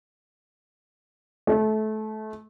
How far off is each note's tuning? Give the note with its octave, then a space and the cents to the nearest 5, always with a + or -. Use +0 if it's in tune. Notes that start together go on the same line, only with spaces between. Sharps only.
A3 -25